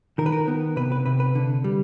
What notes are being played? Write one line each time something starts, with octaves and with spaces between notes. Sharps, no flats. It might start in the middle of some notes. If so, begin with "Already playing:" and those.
D#3 A#4
B4
A#4
B3
C3 B4
B4
C3 B4
B4
D3
G3